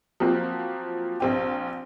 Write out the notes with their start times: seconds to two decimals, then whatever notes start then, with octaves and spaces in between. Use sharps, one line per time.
0.20 F3 F#3 A#3 C4 F#4
1.20 A#1 C4 G4